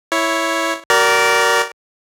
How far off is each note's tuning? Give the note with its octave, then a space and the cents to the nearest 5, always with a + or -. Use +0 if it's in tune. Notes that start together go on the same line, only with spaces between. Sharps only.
E4 +0 C#5 +0
F#4 +40 A#4 +0 D5 -15